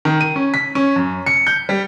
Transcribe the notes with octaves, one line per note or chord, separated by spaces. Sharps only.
D#3
D#7
C#4
B6
C#4
F#2
C#7
G6
G3